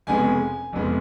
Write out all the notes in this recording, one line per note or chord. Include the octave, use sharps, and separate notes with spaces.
F1 F2 C#3 G#3 B3 G#5
F1 F2 C#3 G#3 B3